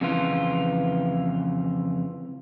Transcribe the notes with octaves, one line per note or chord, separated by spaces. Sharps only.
F2 C#3 E3 F4